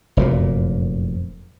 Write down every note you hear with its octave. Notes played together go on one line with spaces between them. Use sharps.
F1 F#2 A#2